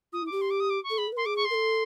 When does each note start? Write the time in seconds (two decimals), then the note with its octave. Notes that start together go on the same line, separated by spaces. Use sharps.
0.13 F4 D#6
0.22 E4
0.27 D6
0.32 G4
0.41 C6
0.50 D6
0.60 D#6
0.70 D6
0.84 C#6
0.90 A4
0.98 G#4 B5
1.07 A4
1.12 B4
1.17 A#4 C6
1.26 G#4 D6
1.36 C#6
1.45 C6
1.50 A#4
1.54 A4